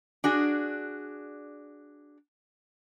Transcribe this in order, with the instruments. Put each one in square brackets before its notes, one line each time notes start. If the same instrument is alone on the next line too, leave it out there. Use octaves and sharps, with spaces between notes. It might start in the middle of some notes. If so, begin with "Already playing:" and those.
[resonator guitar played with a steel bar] D4 F#4 G#4